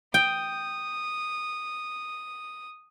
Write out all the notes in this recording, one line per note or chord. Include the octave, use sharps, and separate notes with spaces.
G5 D#6